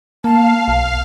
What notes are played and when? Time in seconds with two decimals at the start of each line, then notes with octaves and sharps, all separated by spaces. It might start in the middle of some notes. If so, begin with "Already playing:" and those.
0.24 A#3 F5 A5
0.68 B1 F5